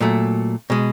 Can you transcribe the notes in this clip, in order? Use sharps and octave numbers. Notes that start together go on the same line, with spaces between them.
A#2 F#3 A3
B2 G#3